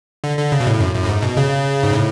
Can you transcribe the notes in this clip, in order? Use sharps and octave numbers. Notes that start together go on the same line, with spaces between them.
D3
D3
C#3
B2
A2
F#2
F#2
A2
G#2
B2
C#3
G#2
A2